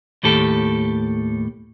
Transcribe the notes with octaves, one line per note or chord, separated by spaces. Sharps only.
D#2 A2 G4 A4